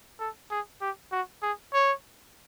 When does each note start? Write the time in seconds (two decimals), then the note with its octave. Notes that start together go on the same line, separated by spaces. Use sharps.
0.20 A4
0.51 G#4
0.81 G4
1.12 F#4
1.42 G#4
1.73 C#5